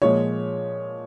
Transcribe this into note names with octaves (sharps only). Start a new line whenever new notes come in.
A#2 F3 G#3 C#5